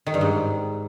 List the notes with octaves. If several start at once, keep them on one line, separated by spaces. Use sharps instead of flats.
D#3
G2
G#2